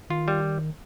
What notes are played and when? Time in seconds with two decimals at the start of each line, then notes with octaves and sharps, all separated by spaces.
0.10 D#3 F4
0.28 G3